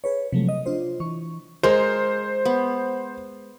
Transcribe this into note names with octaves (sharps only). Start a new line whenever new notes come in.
G#4 B4 C#5
C3 F3 F#3 G#3 A3
D#5
D4 F4 C5
E3 C#6
G#3 A#4 C5
B3